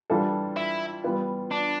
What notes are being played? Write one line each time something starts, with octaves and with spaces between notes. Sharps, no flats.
E3 G3 D4 F4 A4
E4
E3 G3 B3 F4
D4